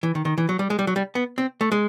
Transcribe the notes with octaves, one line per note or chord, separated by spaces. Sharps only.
E3
D#3
D#3
E3
F#3
G3
G#3
G3
F#3
G3
B3
C4
A3
G#3